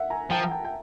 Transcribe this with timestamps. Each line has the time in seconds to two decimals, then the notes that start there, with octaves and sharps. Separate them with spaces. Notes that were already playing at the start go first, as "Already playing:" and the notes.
Already playing: E5 F#5
0.10 G#5 A#5
0.30 F3 G5 A5
0.51 G5 A5
0.65 G5